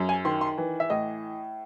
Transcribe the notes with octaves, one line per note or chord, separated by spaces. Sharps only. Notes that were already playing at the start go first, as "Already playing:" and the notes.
Already playing: F#2
G#5
D#3 C6
C6
E3
E5
A2 D#5